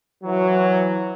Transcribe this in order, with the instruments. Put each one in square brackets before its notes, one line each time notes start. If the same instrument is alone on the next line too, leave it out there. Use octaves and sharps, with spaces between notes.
[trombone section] E3 F#3